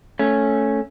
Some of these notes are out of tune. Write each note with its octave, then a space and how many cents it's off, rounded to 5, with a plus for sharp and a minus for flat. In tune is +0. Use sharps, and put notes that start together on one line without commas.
A3 +0 C#4 +0